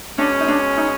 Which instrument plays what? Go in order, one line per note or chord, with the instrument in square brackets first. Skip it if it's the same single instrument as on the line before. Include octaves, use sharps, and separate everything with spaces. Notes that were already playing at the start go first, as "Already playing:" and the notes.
[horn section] B2 G#3 C#4 [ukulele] D4
[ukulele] D#4
D4
D#4